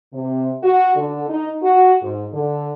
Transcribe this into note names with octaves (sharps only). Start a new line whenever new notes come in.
C3
F#4
D3
D#4
F#4
G#2
D3